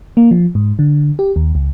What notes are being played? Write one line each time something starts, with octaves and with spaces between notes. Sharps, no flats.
A#3
F3
G#2
D3
G4
D#2
C#2